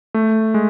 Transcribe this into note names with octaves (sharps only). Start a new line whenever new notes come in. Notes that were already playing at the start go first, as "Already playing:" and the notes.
A3
G#3